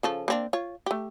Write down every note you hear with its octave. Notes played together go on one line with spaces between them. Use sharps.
C#3 F3 A4
A#3 C4 D4
F4 C#5
A3 G4